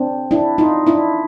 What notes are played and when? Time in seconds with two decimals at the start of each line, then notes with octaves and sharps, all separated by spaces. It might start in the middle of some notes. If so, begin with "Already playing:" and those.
Already playing: C4 D4
0.31 D4 E4
0.58 D#4 F4
0.87 D4 E4